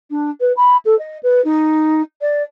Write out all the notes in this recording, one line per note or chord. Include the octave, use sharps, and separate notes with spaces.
D4
B4
B5
A4
D#5
B4
D#4
D5